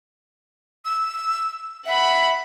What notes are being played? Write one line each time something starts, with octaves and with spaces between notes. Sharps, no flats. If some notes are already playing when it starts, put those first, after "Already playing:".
E6
E5 F#5 B5